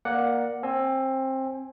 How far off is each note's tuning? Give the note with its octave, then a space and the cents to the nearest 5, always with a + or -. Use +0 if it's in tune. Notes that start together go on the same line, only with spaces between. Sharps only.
A#3 +15 D5 +0 F#5 +0
C4 +20 G#5 +0